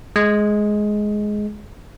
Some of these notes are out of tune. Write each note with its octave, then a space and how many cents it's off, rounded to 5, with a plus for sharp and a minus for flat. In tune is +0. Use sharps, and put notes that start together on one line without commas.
G#3 +10